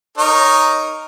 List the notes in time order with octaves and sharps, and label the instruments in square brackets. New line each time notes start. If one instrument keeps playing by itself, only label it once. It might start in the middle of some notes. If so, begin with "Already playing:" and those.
[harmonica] D#4 A#4 C#5